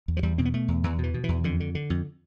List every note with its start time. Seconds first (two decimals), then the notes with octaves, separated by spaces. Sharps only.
0.08 E2
0.17 F3
0.23 E2 G3
0.38 B2 C4
0.45 B3
0.54 B2 A3
0.68 E2
0.84 E2 E3
0.99 B2 E3
1.14 B2
1.24 E2 E3
1.44 F2 D3
1.60 D3
1.75 D3
1.90 F2